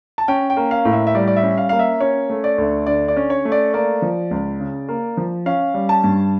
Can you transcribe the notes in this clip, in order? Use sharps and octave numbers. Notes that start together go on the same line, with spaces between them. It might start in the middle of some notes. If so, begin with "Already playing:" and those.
A5
C#4 G5
G5
A#3
F5
A2
E5
E5
G3 D5
D5
E5
C#4
F5
A#3 F5
E5
C#4 C#5
A3
D5
D2
D3 D5
D5
C#4
C#5
A3
D5
A#3 D5
F3
C#2
C#3
A#3
F3
C#4 F5
G3
A5
G2